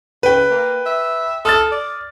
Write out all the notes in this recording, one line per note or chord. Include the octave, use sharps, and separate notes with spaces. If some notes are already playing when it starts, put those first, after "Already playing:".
C#3 B4 G5
A#3
E5
A4 D#6 F6 A6
D5